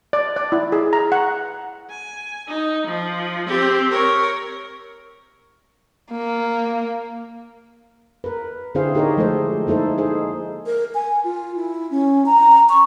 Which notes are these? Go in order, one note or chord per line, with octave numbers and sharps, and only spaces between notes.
D5
D5
E4
G#4
A#5
F#5
G#5
D#4
F3
C4 G4
A#4 C#5
A#3
A#4 B4
D3 C4 E4 G#4 C5 F5
D#4 G4 G#4 A#4 C#5 D#5
F3 G#3 A3 G#4 A4 C5
A#3 D#4 E4 A4 C5
D#4 G#4 C5
A#4
G#5
F4
E4
C#4
A#5
C#6